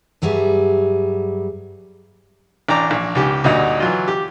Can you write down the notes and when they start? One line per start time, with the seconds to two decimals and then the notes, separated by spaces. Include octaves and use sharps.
0.22 G2 F#3 G3 G#4 E5
2.69 A1 D4 G5 A#5 D6
2.91 A#1
3.15 C#2 G#2 G4
3.44 D2 G2 A#2 D#4 F#4
3.80 E3 F#3 F4
4.08 G4